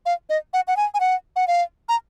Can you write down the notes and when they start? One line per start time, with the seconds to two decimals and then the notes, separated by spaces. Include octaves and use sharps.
0.06 F5
0.30 D#5
0.54 F#5
0.68 F#5
0.77 G#5
0.94 G#5
1.00 F#5
1.36 F#5
1.47 F5
1.89 A#5